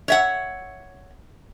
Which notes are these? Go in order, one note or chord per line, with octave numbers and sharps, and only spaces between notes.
C#5 E5 F#5